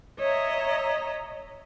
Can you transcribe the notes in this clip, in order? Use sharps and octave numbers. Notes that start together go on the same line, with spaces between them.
C#5 D#5 E5 A#5